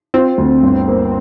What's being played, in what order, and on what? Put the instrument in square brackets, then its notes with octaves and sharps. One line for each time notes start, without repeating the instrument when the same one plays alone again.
[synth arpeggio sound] C4 [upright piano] F4
[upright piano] D2
G1
A#3